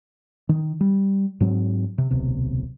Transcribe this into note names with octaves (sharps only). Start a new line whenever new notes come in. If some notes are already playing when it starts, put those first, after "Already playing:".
D#3
G3
G#2 F#3 C4
C3
D1 B1 C3